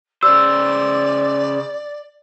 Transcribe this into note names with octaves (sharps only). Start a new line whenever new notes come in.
C#3 C5 D5 E6